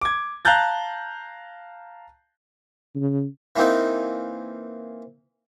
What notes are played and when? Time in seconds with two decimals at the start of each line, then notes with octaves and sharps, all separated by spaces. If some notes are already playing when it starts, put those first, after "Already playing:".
0.01 D6 G#6
0.45 F5 A5 A#5 F#6 G6 A6
2.95 C#3
3.56 E3 A#3 C4 D#4